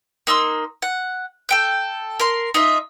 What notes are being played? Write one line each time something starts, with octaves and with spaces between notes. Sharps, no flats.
A#3 D#4 C6 E6
F#5
A4 G5 G6
A#4 C6
D#4 F4 D#5 E5